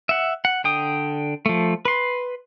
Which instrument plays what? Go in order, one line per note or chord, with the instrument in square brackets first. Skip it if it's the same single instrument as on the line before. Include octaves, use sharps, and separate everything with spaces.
[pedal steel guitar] E5 F#5
F#5
D3 G5 D#6
F3 A3
B4 C6